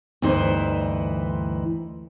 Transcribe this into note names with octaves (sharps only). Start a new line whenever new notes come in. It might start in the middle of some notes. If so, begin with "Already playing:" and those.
D2 G2 E3 D#4 E4 C5